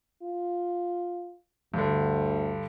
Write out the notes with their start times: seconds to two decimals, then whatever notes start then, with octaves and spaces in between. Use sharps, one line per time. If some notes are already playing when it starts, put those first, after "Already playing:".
0.23 F4
1.74 D2 G2 D3